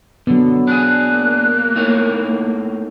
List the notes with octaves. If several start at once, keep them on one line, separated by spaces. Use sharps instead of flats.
D3 F#3 B3
D4 G#4 F#6
A#3
A2 D#4 C#5